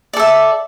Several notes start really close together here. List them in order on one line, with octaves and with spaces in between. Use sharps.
D5 A4 E5